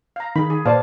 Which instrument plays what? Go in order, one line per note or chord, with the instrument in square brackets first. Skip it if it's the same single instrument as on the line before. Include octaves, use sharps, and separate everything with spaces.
[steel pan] F5 A#5
[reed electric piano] D#3 D#4 [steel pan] G#4 B5
[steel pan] G#4
[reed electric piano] A#2 C5 D5 [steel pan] B4 F5 A5